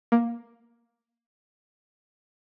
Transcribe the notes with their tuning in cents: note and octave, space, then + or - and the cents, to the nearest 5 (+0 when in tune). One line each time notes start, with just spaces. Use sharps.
A#3 +10